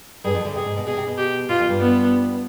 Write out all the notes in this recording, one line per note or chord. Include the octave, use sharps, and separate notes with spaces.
G2 G3 G#4
F2 F3
D2 D3
C3 G#4
G#2
B2
B2 G#4
C3
B2
G4
B2 F4
F2 F3
G2 G3
B3